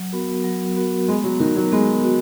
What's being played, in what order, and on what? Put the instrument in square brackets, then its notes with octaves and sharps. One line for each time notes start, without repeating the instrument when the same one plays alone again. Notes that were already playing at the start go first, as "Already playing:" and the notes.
Already playing: [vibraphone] F#3
B3 F#4 A#4
F#3
B3 F#4 A#4
[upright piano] G#3 [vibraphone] B3
[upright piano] F#3
[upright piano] D#3 [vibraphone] F#4 A#4
[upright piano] F#3
[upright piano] G#3 [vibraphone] B3
[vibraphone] F#4